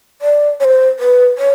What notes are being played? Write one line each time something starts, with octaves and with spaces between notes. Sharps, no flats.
D5
C#5
C5
B4
C#5